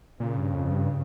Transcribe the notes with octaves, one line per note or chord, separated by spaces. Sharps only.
A#2 C#3
G2
F2
G2